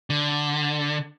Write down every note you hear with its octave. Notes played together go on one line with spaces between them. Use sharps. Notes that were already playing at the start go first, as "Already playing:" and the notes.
D3